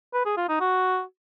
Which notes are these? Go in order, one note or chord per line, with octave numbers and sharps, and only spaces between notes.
B4
G#4
F4
D#4
F#4